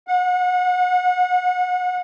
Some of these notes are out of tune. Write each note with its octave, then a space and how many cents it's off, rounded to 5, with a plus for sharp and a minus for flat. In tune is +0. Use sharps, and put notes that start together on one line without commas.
F#5 -30